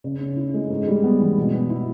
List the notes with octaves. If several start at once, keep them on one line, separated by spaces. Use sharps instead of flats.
C#3
C#4
E4
G#3
G#2
G3
B3
E3
B2
B3
E4